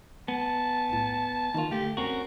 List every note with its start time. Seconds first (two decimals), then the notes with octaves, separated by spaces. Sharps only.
0.28 B3 A5
0.89 B1 A2
1.54 D#2 D#4 F4 A#4
1.71 D3 A3 G4
1.97 F2 C4 C#4 F#4 A#4